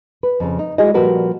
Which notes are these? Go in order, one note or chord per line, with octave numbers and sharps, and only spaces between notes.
B4
F2 C#3
D#4
G#3 E4 F#4 G#4 D#5
A#2 F3 G3 F#4 A#4 B4